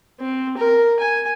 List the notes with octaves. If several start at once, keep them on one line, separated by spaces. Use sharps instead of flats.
C4
A#4
G#5